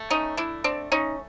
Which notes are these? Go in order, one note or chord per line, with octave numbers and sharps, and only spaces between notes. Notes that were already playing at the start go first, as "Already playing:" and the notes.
Already playing: A3
C#4 D#4
D4 E4
C4 D4
C#4 D#4